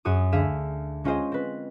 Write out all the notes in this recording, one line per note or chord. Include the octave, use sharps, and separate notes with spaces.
F#2 F#4 G#4 D#6
D2 G#4 F5 E6 B6 E7
G#3 C#4 F4 G#4 C5 D#5
C4 B4